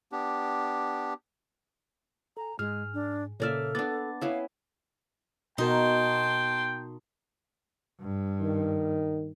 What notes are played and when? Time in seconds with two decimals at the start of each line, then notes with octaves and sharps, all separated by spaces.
0.12 B3 D4 G4
2.37 A4 G#5 A#5
2.59 G#2 G#3 G#4 F6
2.94 D4
3.40 A#2 C#3 A#3 A4 C#5 D5 E5 F6
3.75 B3 D4 D6 A6
4.21 B3 C#4 E4 F5
5.58 B2 D#4 F#4 A#4 G5 A5 C6
8.00 G2
8.41 D#3